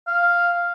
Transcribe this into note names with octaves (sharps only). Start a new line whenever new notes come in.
F5